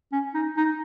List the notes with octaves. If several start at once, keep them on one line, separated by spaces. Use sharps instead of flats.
C#4
D#4
D#4